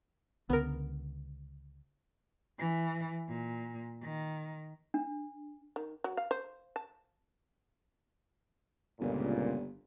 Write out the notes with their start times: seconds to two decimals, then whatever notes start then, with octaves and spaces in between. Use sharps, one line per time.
0.50 C#2 D3 B3 A#4
2.59 E3
3.29 A#2
4.03 D#3
4.94 D4
5.76 D#3
6.04 F#3
6.17 F5
6.31 C5
6.76 A5
9.00 G1 C#2 A#2